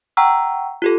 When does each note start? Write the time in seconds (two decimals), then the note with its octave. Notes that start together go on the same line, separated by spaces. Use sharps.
0.17 F#5 G5 A#5 C#6 E6 F6
0.82 F4 G4 A4